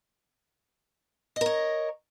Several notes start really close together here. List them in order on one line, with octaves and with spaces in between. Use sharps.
D#5 A#4 C#5